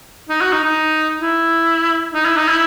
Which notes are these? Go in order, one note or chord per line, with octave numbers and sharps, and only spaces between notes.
D#4
F#4
D#4
D#4
E4
D#4
E4
D#4
E4